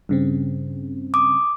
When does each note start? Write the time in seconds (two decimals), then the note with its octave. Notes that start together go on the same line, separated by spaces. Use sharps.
0.09 G2 C#3 C4
1.14 D6 D#6